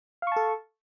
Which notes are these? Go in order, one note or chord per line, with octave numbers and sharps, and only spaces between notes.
A4 F5 A5 C#6